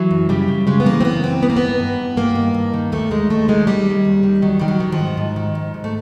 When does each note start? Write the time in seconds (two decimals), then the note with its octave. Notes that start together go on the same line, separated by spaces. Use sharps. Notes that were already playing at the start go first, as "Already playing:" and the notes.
Already playing: E3 F#3
0.11 F#2
0.29 C#3 G3
0.48 C#3
0.67 C#3 G#3
0.80 B3
0.85 E3 A#3
1.01 C4
1.04 F#2 B3
1.23 E3 C4
1.42 G2 B3
1.50 A#3
1.57 D#3 B3
1.80 G2
1.99 G2
2.17 G2 A#3
2.35 D#3
2.54 G2
2.74 D#3
2.92 D#2 A3
3.11 D#2 G#3
3.30 D#3 A3
3.48 D#3 G#3
3.67 D#3 G3
3.86 D#2
4.05 D#2
4.23 D#3
4.42 D#3 F#3
4.59 D#3 G3
4.68 F#3
4.80 D#3
4.92 F3
4.99 G#2
5.17 G#2
5.36 D#3
5.55 G#2
5.74 G#2
5.84 A3